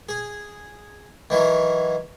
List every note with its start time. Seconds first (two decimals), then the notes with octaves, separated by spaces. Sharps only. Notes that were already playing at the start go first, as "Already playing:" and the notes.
0.09 G#4
1.30 D#3 E3 F#3